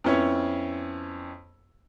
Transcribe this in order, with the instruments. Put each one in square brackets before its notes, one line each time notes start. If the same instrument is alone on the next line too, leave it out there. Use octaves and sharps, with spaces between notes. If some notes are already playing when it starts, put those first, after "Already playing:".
[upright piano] F2 B3 C#4 E4 C#5